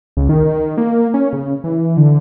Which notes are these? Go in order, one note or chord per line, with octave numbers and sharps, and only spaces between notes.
C#2
D#3
A#3
C#4
C#3
E3
D3